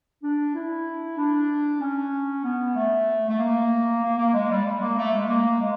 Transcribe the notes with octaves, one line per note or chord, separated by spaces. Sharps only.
D4
E4
D4
C#4
B3
A3
A3
A#3
A#3
A#3
G#3
G3
G#3
A#3
A3
G#3
A#3
G#3